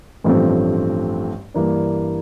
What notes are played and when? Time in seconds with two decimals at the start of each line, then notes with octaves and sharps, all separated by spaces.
0.24 A1 G2 F3 A3 C4
1.54 G2 E3 A#3 D4